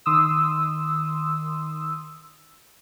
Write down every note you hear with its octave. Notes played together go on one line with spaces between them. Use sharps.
D#3 C6 D#6 E6